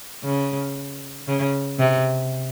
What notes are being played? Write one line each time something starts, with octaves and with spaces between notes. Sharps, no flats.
C#3
C#3
C3